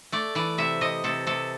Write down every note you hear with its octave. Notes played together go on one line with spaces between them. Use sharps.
A3 D5
E3 D5
C3 E5
C3 D#5
C3 A4
C3 A4